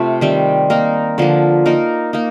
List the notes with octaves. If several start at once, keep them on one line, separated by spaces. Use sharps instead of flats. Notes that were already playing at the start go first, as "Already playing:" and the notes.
Already playing: C3 A3 F4
D#3 G3 C4
A#3 D#4 A#4
D3 F3 A#3
A#3 D#4 A#4
A#3 D#4